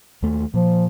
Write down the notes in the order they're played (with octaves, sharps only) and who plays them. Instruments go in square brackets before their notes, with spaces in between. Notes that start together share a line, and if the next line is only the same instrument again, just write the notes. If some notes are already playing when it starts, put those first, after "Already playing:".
[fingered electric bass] D#2 A3
[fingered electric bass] A#2 [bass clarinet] F3